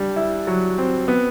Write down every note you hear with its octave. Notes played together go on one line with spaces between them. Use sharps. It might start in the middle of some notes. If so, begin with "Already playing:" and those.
Already playing: G3 D4
E4
F#3
C4
B3